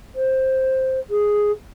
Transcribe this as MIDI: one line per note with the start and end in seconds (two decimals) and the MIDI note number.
0.15 1.00 72
1.10 1.52 68